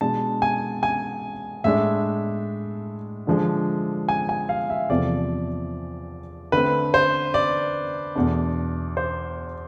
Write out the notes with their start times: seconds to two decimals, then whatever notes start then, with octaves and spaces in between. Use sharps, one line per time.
0.01 B2 G#3 D4 A5
0.42 G#5
0.83 G#5
1.64 A2 G#3 D4 E5
3.27 D3 F3 G#3 D4
4.09 G#5
4.29 G#5
4.49 F5
4.70 E5
4.90 E2 C3 F3 A3 C4 D5
6.52 D3 A3 C4 B4
6.94 C5
7.34 D5
8.16 E2 B2 A3 D4
8.97 C5